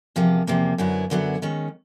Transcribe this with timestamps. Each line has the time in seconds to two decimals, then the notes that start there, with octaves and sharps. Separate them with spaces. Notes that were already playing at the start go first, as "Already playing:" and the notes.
0.16 E2 C3 F3 A#3
0.47 E2 C3 F3 A#3
0.78 F#2 D3 F#3 B3 E4
1.10 F#2 D3 F#3 B3 E4
1.42 D#3 G#3 C#4